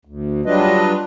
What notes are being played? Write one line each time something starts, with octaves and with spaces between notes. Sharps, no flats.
D2
F#3 G3 D4 F4 B4 D#5